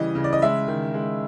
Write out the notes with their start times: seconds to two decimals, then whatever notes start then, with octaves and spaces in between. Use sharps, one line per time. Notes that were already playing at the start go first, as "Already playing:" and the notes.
Already playing: C#3 E3 G3 D#5
0.15 C#3
0.24 D5
0.33 D#5
0.42 G#3 E5
0.68 D#3
0.94 G#3